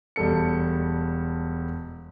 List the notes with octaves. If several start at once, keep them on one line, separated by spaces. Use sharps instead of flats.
E1 G3 A4 C#7